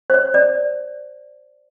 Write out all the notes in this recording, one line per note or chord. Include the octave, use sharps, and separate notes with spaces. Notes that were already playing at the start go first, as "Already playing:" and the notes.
C5
C#5
D5